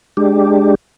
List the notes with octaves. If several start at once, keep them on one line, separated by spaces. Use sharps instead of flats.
G#3 D4 G4